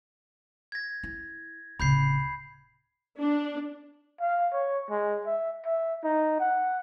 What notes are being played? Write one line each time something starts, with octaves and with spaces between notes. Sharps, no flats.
G#6 A#6
E4
D1 C#3 B5 G6 C7
D4
F5
C#5
G#3
E5
E5
D#4
F#5